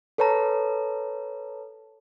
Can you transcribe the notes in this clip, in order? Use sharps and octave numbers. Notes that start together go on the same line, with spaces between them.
A4 B4 C#5 A5 A#5